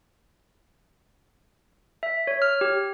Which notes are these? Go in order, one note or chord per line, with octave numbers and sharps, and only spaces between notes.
E5
C#5
F6
G4